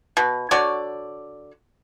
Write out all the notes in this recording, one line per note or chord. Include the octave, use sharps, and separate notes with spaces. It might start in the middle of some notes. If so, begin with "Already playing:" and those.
B2
D3 F#4 C#5 D5